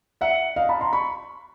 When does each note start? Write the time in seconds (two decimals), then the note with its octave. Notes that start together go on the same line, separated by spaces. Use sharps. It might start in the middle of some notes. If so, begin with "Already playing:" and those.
0.21 E5 F#5
0.56 D#5 F5
0.69 A5 B5
0.81 A#5 C6
0.93 B5 C#6